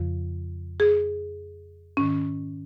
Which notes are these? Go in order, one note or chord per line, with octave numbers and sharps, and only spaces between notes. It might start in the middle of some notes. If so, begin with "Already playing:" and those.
Already playing: F2 C#3 F3
G#4
G#2 D#3 C#4